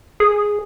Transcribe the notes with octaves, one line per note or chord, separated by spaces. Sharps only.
G#4